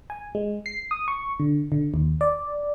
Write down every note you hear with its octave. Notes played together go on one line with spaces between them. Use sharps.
G#5
G#3
C7
D#6
C#6
D3
D3
D#2
D5